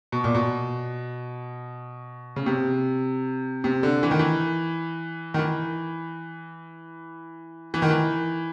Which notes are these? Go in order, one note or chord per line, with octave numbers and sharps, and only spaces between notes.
B2
A#2
B2
C#3
C3
C3
D3
E3
D#3
E3
D#3
E3
E3
D#3
E3